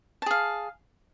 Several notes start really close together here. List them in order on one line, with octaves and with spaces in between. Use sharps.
A5 G#4 F5